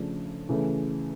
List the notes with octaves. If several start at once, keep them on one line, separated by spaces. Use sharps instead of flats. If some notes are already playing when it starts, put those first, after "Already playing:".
Already playing: C#3 F3 A3 D4
C#3 E3 A3